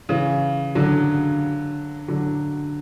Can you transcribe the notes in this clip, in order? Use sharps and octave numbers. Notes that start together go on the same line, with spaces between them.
C#3 E3
D3 F#3
D3 F#3